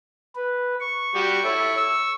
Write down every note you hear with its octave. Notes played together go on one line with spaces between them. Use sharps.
B4
C#6
G3 F#4 G4
E4 A4 C#5
E6